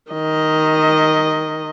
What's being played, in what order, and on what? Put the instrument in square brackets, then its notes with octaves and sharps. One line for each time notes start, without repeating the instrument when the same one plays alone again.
[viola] D#3 D#5